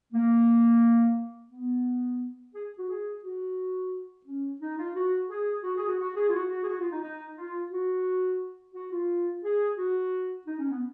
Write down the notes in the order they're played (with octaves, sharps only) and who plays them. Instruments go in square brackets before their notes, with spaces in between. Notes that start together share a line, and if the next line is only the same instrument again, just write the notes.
[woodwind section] A#3
B3
G#4
F#4
G#4
F#4
C#4
D#4
F4
F#4
G#4
F#4
G#4
F#4
F#4
G#4
F4
F#4
F#4
G#4
F#4
F4
D#4
D#4
F4
F#4
F#4
F4
G#4
F#4
D#4
C#4
B3